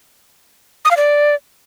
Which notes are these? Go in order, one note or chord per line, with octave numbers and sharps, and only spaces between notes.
D#6
F5
D5